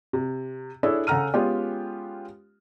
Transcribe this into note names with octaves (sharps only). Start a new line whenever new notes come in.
C3
D4 E4 G#4 A4 C#5
C#3 A4 F#5 A#5 F6 D#7
G#3 B3 C#4 F4 G4